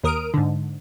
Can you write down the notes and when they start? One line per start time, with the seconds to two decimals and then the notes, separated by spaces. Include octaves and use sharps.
0.04 D#2 A#4 D#6 F6 D7
0.34 G#2 D3